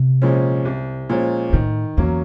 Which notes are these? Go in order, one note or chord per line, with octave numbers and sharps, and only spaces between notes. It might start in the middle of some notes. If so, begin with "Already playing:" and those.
Already playing: C3
A#2 F3 G#3 C#4
C2
A#2 F3 G#3 C#4
A2 D#3
E2 F#3 A#3 C#4